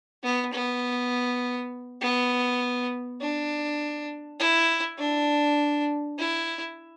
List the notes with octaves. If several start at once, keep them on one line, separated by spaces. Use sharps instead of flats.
B3
B3
B3
D4
E4
D4
E4